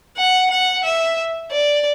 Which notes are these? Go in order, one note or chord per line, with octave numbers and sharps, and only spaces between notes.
F#5
F#5
E5
D5